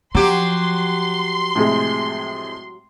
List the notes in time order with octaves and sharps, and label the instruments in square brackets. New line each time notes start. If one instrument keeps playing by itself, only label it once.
[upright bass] F3 [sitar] F#3 G4 [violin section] C6
[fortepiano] A2 C3 G#3